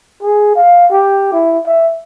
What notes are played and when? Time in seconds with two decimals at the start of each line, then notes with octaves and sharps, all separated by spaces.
0.22 G#4
0.55 F5
0.91 G4
1.33 E4
1.67 E5